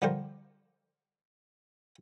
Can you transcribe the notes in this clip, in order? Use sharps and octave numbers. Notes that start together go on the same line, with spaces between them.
D3 F3 G3 G4 A#4 C5